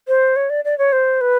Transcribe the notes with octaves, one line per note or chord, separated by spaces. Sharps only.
C5
C#5
D5
D5
C#5
C5
B4